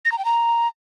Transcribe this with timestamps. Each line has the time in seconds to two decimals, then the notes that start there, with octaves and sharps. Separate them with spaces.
0.05 A#6
0.12 A#5
0.18 G5
0.25 A#5